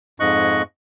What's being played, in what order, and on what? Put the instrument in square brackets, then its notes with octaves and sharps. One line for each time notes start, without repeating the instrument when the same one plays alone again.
[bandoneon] F2 G#2 D#5 C#6 F#6